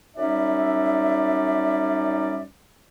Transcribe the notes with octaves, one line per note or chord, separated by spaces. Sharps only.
F#2 G3 C#4 D#4 D5 E5